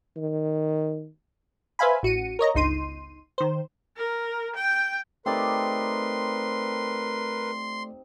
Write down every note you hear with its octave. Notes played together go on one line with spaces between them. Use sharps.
D#3
B4 C5 E5 F5 G#5 B5
A1 F#4 C#7 D#7
A#4 C#5 D#5 A#5
G1 C#2 D#4 C6 D#7
D#3 C5
A#4
G5
A3 C4 D#4 G4 A#4 B4 D5 C6